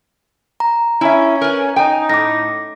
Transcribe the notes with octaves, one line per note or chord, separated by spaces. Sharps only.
A#5
C#4 E4 E5
A#4 B4
D#4 G5 G#5
A2 D6 A#6